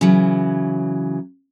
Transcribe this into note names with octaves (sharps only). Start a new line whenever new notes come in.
C#3 E3 F#3